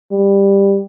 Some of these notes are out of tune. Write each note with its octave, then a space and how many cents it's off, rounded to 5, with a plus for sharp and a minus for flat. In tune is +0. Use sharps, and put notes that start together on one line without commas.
G3 +15